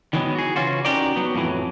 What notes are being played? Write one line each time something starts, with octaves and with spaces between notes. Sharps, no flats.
D#3 E3 F#3 G#3 B3
F#4 G#4
C#3 E3 C#4 F4 F#4
C#4 D#4 F#4 G4 A#4 D5
F#3 B3
F2 A2 C3 E3 F#3